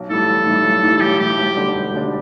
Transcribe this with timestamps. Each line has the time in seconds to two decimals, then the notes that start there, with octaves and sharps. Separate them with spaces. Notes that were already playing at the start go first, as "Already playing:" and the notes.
Already playing: B1
0.09 A2 E3 G3 A4
0.28 B1
0.46 A2 E3 G3
0.64 B1
0.83 A2 E3 G3
0.97 A4
1.01 B1 G4
1.19 A2 E3 G3 G4
1.38 E1
1.56 D2 D3 G3 D4
1.75 E1
1.93 D2 D3 G3 D4